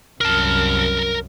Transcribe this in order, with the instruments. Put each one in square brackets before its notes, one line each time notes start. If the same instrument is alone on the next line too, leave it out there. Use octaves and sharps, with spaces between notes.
[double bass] C2 F#2 [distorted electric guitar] A#4 A5 [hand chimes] F6